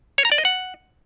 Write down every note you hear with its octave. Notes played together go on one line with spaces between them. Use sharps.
C#5
A#5
D5
D#5
F#5